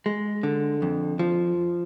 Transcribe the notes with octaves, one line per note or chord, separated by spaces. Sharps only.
G#3
D3
F2
F3